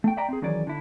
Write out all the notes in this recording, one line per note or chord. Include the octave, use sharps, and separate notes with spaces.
A3 G5
D5 E5 G5 A#5
C4 G#4
D#3 E3 F#3 C#4 G#4 D5
D3 E4